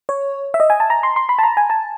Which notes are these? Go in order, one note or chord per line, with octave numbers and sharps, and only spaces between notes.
C#5
E5
D#5
G#5
A5
A#5
C6
C6
B5
A5
A#5
G#5
A5